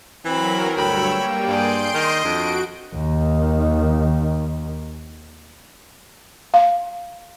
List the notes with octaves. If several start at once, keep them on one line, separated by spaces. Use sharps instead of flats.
E3 F#3 C4 A#4 B5
D2 G2 C#5 G5 B5 E6
G3 A#3
G2 G#4 D5 C6 G6 D7
D#3 D#5
F2 D4 F#4 D7
D#2 D#3
F5